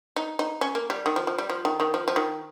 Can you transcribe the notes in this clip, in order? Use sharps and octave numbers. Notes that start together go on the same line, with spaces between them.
D#4
D#4
C#4
A#3
G3
D#3
F3
F3
G3
F3
D#3
D#3
F3
F3
D#3